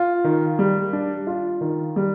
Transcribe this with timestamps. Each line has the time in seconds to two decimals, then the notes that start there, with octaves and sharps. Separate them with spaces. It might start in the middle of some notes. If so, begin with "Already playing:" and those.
Already playing: F4
0.24 D#3
0.59 G3
0.93 D4
1.27 F4
1.61 D#3
1.96 G3